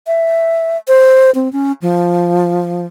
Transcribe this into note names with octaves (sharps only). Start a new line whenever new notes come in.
E5
C5
C4
C#4
F3